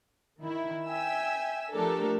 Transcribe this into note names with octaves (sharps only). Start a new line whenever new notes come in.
D#3 E4
E5 G5 G#5 E6
F3 A3 D4 G4 A4 A#4